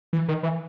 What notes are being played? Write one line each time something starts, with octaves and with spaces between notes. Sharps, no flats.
E3
D#3
E3